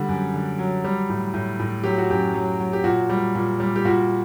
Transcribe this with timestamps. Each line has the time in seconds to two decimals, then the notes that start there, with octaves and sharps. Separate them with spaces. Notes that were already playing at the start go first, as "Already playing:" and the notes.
Already playing: D3 G3 F#5
0.08 F#2
0.34 D3
0.59 F#3
0.84 G3
1.09 A2
1.34 A2
1.59 A2
1.84 F#3 G4
1.98 F#4
2.10 F#2 G4
2.34 F#3
2.60 F#3
2.73 G4
2.84 A#2 F#4
3.09 G3
3.35 A#2
3.60 G3
3.76 G4
3.85 A#2 F#4